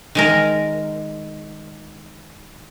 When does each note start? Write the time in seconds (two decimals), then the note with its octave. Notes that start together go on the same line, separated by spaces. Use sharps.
0.15 D#3 G#3 A#4